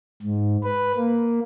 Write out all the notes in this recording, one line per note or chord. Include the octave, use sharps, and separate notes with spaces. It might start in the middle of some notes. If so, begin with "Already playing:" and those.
G#2
B4
A#3